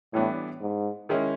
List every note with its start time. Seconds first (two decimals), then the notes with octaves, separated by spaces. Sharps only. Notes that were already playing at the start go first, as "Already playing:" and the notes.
0.14 A2 E3 G3 B3 D4
0.61 G#2
1.09 D#3 G#3 C#4 E4